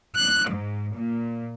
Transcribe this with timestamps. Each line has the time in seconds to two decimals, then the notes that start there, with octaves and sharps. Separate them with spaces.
0.17 F#6
0.49 G#2
0.95 A#2